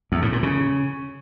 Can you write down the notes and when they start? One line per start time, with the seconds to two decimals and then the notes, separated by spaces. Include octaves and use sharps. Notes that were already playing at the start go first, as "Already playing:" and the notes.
0.12 E2
0.22 A2
0.32 A#2
0.43 C#3